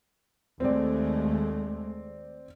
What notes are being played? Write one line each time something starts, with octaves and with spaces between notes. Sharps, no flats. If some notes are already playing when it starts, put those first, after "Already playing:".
D#2 G#3 A3 C4 D5